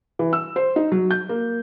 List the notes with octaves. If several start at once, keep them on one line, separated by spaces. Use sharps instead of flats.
E3
E6
C5
D#4
F#3
G6
A#3